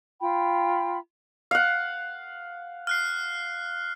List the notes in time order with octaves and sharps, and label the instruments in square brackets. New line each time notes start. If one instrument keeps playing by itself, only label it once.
[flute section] F4 G5 B5
[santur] F5 F#5
[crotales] F6 F#6 C7